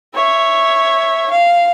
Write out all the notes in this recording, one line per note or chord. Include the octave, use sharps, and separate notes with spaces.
C#5 E5
F5